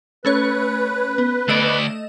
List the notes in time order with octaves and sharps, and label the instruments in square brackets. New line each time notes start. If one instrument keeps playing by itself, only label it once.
[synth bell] A3 C#4 C#5 [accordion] B4
[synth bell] B3
[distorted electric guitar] D2 D5 [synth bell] A3 D#5 E7